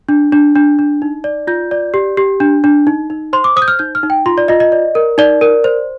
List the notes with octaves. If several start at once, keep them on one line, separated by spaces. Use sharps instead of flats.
D4
D4
D4
D4
D#4
D5
F4 G6
D5
G4
G4
D4
D4
D#4
D#4
C5 C6
D6
C5 D#6
G6
F6
D#4 G6
F6
D#4
G5
F4 C6
D5
F4 D#5
D#5
D5
A#4
D#4 D5
A#4
C5